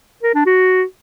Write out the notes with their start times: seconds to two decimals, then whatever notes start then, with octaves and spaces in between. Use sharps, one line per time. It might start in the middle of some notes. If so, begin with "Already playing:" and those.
0.23 A#4
0.35 D4
0.46 F#4